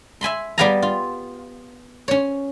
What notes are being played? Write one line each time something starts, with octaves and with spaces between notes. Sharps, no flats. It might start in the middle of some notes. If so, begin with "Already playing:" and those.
E5 G#5 B5 C6
G3 B3 G4 F5 G#5 A#5
F4
C#4 C#5